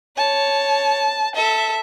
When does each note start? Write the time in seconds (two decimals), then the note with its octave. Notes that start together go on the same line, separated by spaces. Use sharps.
0.18 C#5 A5
1.35 A4 E5